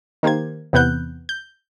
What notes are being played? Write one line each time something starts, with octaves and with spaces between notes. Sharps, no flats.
D#3 A#3 G4 C5 G#6
E2 C3 B3 F#6 G6
G6